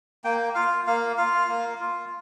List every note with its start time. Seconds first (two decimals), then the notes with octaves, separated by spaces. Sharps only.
0.24 A#3 G5
0.55 F4 F5
0.87 A#3 F5
1.18 F4 F5
1.49 A#3
1.80 F4